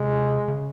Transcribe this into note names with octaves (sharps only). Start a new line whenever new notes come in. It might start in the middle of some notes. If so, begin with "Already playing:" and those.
Already playing: C3 G#3
C#3